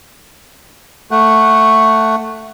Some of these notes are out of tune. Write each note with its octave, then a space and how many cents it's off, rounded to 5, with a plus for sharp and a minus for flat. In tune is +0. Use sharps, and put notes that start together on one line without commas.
A3 +10 F#5 +0